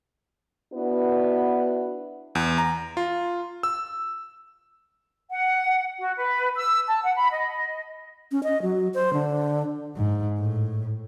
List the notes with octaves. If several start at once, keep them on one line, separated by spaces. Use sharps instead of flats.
B3 D4 E4 F#4 B4
E2
A#5
F4
E6
F#5
F#4
B4
E6
A5
F#5
B5
D#5
C#4
D#5
F#3
C5
D3
G#2
A2